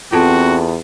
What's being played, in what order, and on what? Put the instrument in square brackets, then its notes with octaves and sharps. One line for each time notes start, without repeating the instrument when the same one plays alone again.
[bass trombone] E2 [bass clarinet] C4 [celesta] F4 A4 A5 [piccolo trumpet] F#4